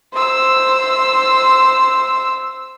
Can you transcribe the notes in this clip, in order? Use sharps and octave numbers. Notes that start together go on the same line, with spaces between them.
C5 E6